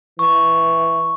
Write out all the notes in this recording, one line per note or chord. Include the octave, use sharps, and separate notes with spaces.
E3 C#6